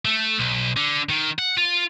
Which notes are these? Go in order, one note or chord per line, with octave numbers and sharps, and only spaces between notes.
A3
B1
D3
D#3
F#5
F4